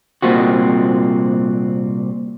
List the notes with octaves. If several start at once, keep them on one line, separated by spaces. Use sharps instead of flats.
C2 A#2 C4 F#4